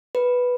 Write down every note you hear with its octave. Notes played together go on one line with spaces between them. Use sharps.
B4